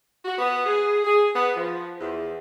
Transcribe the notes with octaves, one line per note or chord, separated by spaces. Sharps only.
F#4
B3
G#4
G#4
B3
F3
E2